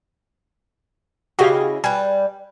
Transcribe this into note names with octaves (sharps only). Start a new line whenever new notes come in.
C#3 E4 F#4 G4 D#5 F5
G3 B4 G#5